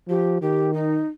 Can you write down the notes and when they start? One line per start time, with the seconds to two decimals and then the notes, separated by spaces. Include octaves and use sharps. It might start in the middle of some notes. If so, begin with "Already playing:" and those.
0.08 F3 G4
0.42 D#3 G4
0.74 D#4